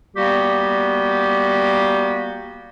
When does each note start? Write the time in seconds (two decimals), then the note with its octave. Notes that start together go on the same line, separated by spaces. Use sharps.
0.16 G3 A#3 B3 F#4 G4